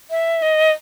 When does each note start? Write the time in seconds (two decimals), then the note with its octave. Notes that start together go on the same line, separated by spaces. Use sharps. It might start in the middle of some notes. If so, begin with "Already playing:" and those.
0.10 E5
0.42 D#5